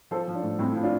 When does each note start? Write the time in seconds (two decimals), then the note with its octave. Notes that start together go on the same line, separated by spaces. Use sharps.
0.11 F3 A4 C5
0.28 F3
0.35 D4
0.43 A2
0.59 A2 C4 E4
0.75 F3
0.83 D4 F4